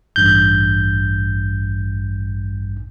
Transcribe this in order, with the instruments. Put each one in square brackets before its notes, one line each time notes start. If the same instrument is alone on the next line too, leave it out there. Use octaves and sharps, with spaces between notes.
[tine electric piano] A1 G2 G6